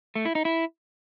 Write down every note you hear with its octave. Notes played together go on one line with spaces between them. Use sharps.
A3
E4
D#4
E4